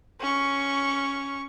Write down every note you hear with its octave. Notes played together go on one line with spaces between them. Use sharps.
C#4 C#6